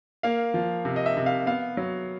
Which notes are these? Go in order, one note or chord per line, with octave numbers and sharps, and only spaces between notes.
A#3 F5
F3
C3
D#5
E5
C3
F5
B3 F5
F#3